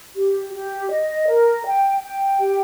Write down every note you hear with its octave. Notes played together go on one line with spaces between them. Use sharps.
G4
G4
D#5
A#4
G5
G5
G4